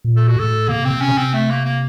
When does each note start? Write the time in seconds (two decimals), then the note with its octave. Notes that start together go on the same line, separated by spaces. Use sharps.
0.04 A#2
0.16 A4
0.28 F#4
0.37 A2 A4
0.69 C3 A#3
0.85 C4
0.90 C3
1.01 C#4
1.12 C3
1.18 C4
1.33 A3
1.50 A#3
1.65 A#3